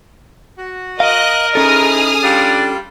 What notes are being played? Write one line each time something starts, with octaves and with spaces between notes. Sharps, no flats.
F#4
A#4 D#5 F5 F#6
G#2 C#4 D#4 E4 G#4 A4 D#6 F6
G3 D4 F4